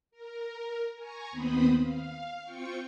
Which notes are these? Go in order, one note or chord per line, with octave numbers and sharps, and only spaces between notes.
A#4
G#5 A#5 C#6
D#2 B3 C4 C5 B5 D#6
F5
C4 F4 G5 C#6 C#7